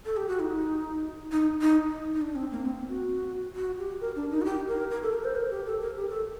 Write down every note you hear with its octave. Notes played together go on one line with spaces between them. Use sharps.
A4
G4
F#4
D#4
D#4
D#4
D#4
D4
C4
A#3
C4
F#4
F#4
G4
A#4
D4
D#4
F#4
G4
A#4
A#4
A4
A#4
C5
A#4
G4
A4
A#4
G4
A4